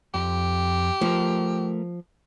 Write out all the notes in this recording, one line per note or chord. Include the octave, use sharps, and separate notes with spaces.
F2 G4 G5
F3 A3 A#4